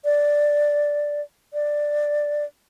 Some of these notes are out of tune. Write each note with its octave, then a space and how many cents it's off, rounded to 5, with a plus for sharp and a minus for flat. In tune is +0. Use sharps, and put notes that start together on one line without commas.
D5 +0
D5 +5